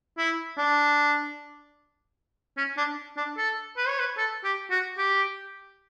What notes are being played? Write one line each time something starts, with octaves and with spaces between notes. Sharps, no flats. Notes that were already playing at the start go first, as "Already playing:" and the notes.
E4
D4
C#4
D4
D4
A4
B4
C#5
B4
A4
G4
F#4
G4